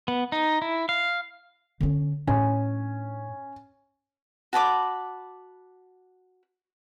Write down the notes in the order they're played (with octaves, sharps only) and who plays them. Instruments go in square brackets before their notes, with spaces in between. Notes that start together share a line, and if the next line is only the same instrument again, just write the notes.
[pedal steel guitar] B3
D#4
E4
F5
[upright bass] D3 C#4
[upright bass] A2 D4 [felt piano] C#4 G#5
[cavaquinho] F#4 A5 B5 D6